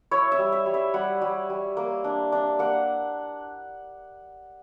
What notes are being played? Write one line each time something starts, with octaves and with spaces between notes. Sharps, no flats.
E4 C#5
E5
G3
E5
G3
E5
G3 F#5
G3
G3
A#3
D4
D4
A#3 F#5